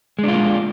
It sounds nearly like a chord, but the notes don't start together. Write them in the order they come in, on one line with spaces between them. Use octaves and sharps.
G#3 D4 F4 A#3